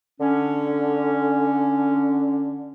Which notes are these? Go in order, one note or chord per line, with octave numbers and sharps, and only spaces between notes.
D3 C#4